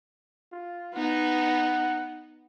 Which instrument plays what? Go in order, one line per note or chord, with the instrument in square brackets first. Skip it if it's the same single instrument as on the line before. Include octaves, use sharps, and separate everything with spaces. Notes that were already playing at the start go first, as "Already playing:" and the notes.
[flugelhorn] F4
[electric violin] B3 D#4 [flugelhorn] F#5